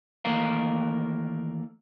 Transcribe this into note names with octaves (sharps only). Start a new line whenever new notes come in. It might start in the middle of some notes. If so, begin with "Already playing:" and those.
D#2 E3 A3 A#3 A#4 F5